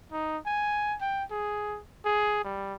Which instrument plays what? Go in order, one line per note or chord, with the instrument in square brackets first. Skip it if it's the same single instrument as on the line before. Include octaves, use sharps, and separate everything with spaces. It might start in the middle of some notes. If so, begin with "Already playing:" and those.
[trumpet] D#4
G#5
G5
G#4
G#4
G3